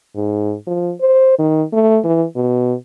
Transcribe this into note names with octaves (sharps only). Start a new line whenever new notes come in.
G#2
F3
C5
D#3
A3
E3
B2